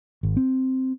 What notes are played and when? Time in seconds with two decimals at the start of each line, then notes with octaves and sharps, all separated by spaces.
0.23 G#1
0.37 C4